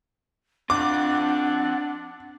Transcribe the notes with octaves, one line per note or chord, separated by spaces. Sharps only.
C4 D4 F4 F#5 D6